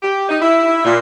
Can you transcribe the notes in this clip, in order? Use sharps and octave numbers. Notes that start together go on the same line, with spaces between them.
G4
D#4
E4
A#2